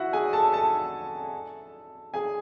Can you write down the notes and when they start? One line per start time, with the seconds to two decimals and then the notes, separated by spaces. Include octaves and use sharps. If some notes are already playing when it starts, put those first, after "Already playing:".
Already playing: E4 F#4 E5 F#5
0.13 G#4 G#5
0.33 A4 A5
0.53 A4 A5
2.14 G#4 G#5